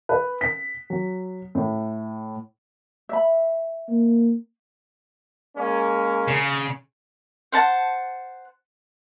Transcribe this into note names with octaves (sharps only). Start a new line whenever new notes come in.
B4
B6
F#3
A2
E5 B5
A#3
G#3 A#3 C#4
C#3
C5 F#5 A5